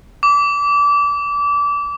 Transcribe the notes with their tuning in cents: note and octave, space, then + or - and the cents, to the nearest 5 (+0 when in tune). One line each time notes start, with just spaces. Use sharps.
D6 -25